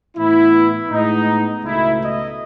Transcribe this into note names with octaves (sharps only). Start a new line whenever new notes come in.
A2 E3 B3 E4
A2 G#3 B3 D#4
C#2 B2 A3 E4
D#5